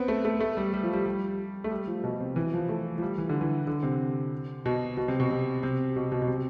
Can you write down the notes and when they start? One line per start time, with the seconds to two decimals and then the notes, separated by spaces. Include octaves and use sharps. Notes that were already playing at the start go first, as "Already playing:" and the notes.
Already playing: B3 C4
0.08 A3
0.25 A3
0.40 A3
0.57 G3
0.73 G3
0.83 F3
0.93 G3
1.06 G3
1.64 A3
1.71 G3
1.87 F3
2.04 B2
2.20 C3
2.36 E3
2.53 F3
2.69 A3
2.98 F3
3.02 G3
3.18 E3
3.29 D3
3.41 E3
3.67 D3
3.83 C3
4.66 B2
4.97 B2
5.08 C3
5.20 B2
5.31 C3
5.63 C3
5.96 B2
6.12 B2
6.22 B2
6.28 C3